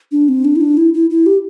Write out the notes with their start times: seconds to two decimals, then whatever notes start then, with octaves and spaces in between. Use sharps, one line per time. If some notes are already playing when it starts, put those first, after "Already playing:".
0.12 D4
0.28 C4
0.45 D4
0.56 E4
0.61 D4
0.77 E4
0.94 E4
1.10 E4
1.26 G4